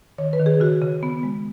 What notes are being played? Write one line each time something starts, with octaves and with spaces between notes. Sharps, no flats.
D#3 C#5
B4
D#3
G#4
C#3 F#4
C#3
B3
G#3